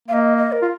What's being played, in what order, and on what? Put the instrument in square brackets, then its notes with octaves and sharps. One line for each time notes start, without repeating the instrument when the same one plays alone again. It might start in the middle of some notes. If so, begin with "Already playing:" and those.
[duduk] A#3 [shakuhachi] F5
[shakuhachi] D#5
D#5
A#4
[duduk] F4